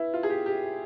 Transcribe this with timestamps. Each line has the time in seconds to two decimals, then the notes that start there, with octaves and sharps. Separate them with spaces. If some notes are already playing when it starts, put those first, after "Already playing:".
Already playing: E4 B4
0.14 F4
0.23 G#4
0.30 G4
0.46 G4